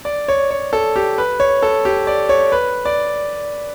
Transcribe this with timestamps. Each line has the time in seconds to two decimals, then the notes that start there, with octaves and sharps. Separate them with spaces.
0.05 D5
0.28 C#5
0.51 C#5
0.73 A4
0.96 G4
1.18 B4
1.40 C#5
1.62 A4
1.85 G4
2.07 D5
2.29 C#5
2.52 B4
2.85 D5